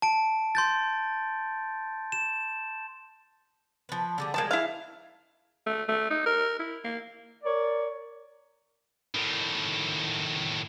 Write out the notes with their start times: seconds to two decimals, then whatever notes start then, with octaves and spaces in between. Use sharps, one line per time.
0.02 A5 D7
0.55 C6 G6 A6
2.12 E7
3.89 F3 B4
4.18 D3 G3 G#4
4.34 F3 G3 G#3 A#3 A5
4.51 E4 F5
5.66 A3
5.88 A3
6.10 D#4
6.26 A#4
6.59 E4
6.84 A#3
7.44 A#4 C#5 D5
9.15 A2 D#3